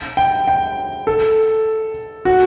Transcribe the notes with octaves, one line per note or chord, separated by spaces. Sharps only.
G5
G5
A4
F#4